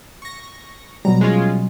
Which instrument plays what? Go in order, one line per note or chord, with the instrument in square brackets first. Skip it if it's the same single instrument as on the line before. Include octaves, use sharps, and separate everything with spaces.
[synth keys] C#6 A#6
[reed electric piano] B2 F#3 G3 [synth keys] A#5
[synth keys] G#3 C#4 F4